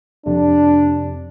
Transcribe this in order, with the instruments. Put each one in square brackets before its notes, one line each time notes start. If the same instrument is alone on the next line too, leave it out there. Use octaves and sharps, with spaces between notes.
[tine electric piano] F2 C3 [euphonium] D4